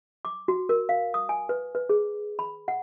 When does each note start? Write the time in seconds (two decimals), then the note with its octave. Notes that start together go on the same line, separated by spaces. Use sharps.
0.25 D6
0.48 F#4
0.69 A#4
0.89 F5
1.14 D#6
1.29 G#5
1.49 B4
1.75 B4
1.89 G#4
2.39 B5
2.68 F#5